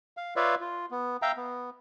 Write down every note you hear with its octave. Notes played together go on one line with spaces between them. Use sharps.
F5
F4 B4 C#5 D5 E5 F5
F4
B3
E5 F5 G5 A#5
B3